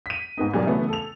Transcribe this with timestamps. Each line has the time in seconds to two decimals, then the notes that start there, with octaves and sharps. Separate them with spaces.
0.06 B6 D#7
0.38 G#2 B3 D#4
0.54 B1 G2 G#4 A#4 D5
0.65 C#3 E3 F#3 A3 B3
0.89 A4 F7